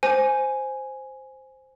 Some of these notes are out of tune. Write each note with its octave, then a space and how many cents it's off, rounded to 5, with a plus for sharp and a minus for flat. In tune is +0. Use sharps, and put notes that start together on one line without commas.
C5 +0 G#5 +0